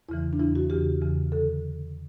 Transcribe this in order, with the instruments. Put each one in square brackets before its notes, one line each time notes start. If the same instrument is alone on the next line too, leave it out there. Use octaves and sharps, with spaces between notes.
[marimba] E2 C#3 E3 E4
D4
E2 C#3 E3 E4
F#4
E2 C#3 E3 G4
E2 C#3 E3
D3 A4